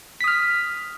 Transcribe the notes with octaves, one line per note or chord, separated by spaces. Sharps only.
D#6 F6 B6